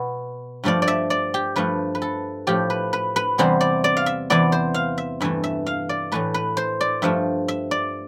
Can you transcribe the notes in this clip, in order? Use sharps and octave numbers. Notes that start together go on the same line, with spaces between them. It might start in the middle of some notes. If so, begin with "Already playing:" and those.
Already playing: B2 B3
G2 F3 A3 D5
D5
E5
D5
G4
G2 F3 A3 B4
B4
A4
A2 F3 A3 G4
B4
B4
B4
E2 C3 E3 G3 B3 C5
D5
D5
F5
E5
E2 C3 E3 B3 D5
C5
F5
E5
G2 E3 A3 E5
E5
F5
D5
A2 E3 A3 B4
B4
C5
D5
G2 F3 A3 E5
E5
D5